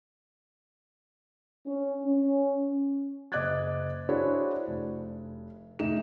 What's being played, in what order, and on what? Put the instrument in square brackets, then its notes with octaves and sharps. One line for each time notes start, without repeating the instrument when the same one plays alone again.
[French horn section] C#4
C#4
[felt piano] F#1 D#5 D6 F#6 G#6 A6
D4 E4 F#4 G#4 C5 C#5
F1
F1 A2 D#4 G#4 E7